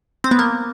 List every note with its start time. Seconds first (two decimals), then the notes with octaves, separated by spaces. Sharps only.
0.24 C4
0.31 B3
0.39 A#3